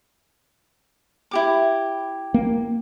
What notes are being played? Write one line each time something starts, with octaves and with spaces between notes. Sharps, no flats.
E4 G4 D6
A#3